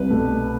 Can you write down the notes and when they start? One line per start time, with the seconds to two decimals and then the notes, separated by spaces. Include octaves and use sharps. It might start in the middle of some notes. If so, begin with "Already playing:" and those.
Already playing: C2 B4
0.10 B2 A3